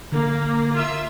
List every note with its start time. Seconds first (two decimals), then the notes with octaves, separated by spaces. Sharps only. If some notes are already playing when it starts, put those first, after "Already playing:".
0.12 D3 A#3
0.74 F4 E5 E6